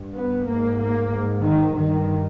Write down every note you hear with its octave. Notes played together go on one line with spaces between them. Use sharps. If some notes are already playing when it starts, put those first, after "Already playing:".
Already playing: G2
B3
G#2 A#3
A#3
G#2
D#3
G2 D#3